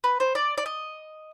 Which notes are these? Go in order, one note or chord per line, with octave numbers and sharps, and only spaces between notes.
B4
C5
D5
D5
D#5